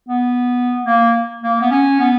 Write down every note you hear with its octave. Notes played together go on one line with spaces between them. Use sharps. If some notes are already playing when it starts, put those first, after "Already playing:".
B3
A#3
A#3
B3
C#4
B3